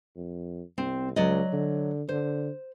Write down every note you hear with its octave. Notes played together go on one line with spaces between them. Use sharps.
F2
C2 C4
C#2 F#3 D5 D#5
D3
D3 C5